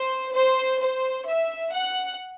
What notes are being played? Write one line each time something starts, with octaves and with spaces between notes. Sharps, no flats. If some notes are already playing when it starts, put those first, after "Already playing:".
Already playing: C5
C5
C5
E5
F#5